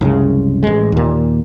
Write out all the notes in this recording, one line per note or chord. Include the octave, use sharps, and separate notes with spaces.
C2 F#2 C#3 G#3
A1 G#3
D#2 A#2